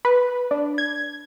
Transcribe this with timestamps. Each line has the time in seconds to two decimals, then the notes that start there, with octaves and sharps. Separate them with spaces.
0.05 B4
0.51 D4
0.78 G#6